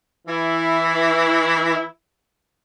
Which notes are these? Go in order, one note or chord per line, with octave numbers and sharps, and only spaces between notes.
E3 E4